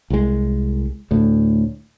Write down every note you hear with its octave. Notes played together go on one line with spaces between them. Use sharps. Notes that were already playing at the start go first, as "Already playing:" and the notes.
C2 G#3
D2 A2